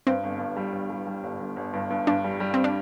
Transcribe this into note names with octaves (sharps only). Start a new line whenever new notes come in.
G2 C4
G1
G2
G3
G1
G3
G3
G1
G1
G1
G2
G2
G2 D4
G3
G3
C4
D4